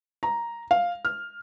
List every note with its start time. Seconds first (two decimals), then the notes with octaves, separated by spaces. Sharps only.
0.23 A#5
0.71 F5
1.05 F6